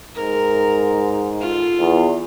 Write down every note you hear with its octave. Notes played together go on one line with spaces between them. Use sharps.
G#2 A#4
F4 A4
E2